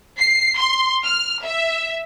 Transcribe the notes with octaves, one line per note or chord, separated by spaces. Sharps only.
C7
C6
F6
E5